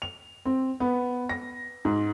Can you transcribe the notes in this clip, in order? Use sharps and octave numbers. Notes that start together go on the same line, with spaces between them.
F7
C4
B3
A#6
G#2